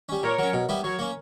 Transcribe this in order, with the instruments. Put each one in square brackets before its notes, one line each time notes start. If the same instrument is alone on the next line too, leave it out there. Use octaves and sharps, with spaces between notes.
[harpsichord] G3 C#4
[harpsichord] A#2 [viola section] A#4 C#5
[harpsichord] F#3 C#4
B2
G3 B3 E4
[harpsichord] F#3 [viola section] A#4 C#5
[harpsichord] A#3 C#4